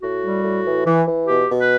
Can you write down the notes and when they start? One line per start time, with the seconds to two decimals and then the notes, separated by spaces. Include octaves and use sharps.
0.01 A2 F#4
0.22 G3
0.44 A2
0.65 E3
0.86 E3
1.07 E3
1.27 B2 G4
1.49 B2
1.60 B4